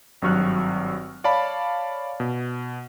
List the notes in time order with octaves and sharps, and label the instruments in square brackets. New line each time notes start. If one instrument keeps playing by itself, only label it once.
[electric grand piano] G#1 G2 F#3 C#6 F6 F#6
C#5 D5 F5 A5 B5
B2